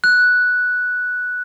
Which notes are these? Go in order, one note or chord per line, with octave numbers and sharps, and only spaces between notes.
F#6